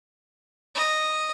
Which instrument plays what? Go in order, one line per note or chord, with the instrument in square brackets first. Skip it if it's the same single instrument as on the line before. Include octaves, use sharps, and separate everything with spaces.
[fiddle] D#5